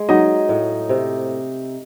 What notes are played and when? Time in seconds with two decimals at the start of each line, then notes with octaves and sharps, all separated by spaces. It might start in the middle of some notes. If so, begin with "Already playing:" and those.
Already playing: G#3
0.09 F#3 D#4 D#5
0.49 A2
0.89 C3